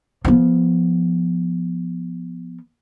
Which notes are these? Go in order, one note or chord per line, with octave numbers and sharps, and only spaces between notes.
F3 B3